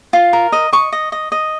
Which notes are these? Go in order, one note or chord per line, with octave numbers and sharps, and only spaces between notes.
F4
A#4
D#5
D#5 C#6
D#5
D#5
D#5